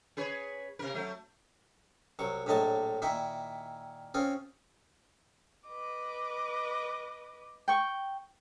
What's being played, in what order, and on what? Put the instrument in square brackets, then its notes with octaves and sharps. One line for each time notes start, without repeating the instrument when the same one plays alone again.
[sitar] G#4 B4 C#5
C3 A#4
F#3 A3
[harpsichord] C2 F#3 C#6
A#1 A2 F#3 D#5 G#5 A5
A#2 D#3 E4 E5 G5
C4 C#4 F4 G#4
[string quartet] B4 D#5 D6
[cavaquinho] G5 C#6